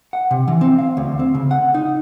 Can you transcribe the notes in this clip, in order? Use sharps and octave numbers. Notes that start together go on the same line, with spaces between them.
F#5
C3
E3
C4
F5
D2
C4
C#3
F#5
D#4